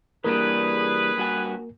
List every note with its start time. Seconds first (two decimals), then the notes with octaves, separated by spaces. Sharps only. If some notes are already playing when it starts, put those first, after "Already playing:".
0.24 E3 G3 A#3 D4 G#4 A#4 B4
1.17 G2 F#4 G#5